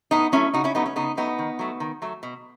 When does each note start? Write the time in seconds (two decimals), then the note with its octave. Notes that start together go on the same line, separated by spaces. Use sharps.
0.11 A2 B3 D#4
0.32 F#3 A3 C#4 E4
0.54 C#3 D#4 F#4
0.64 C#4 E4
0.75 F#3 A3 B3 D#4
0.86 C#4
0.96 C#3 B3 D#4
1.17 F#3 A3 B3 D#4
1.39 D#3
1.59 F#3 A3
1.80 D#3
2.02 F#3 A3
2.23 B2